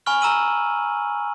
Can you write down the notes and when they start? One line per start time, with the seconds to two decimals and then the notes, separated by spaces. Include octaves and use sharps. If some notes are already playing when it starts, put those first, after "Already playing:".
0.06 G#5 B5 C#6 F6 F#7
0.21 A#5 E6 D#7 F#7